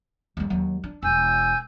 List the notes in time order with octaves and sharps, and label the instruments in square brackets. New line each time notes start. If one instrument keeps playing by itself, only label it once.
[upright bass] D#2 G#3
D#2 F#3
D4
[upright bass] E1 [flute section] G#5 E6 G6